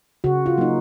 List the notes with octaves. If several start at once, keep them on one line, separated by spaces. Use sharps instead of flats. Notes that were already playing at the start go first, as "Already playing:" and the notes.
C#3 F#4
F4
F#3 A#3 D#4